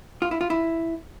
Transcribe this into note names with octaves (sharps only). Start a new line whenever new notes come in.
F4
E4
F4
E4